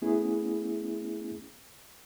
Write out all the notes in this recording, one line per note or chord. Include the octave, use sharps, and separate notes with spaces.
A3 B3 C#4 E4 G#4